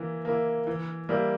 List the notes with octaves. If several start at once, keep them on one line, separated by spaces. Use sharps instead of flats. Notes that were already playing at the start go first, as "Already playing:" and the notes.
Already playing: E3 A#3 E4
A#3 E4
E3
G3 A#3 E4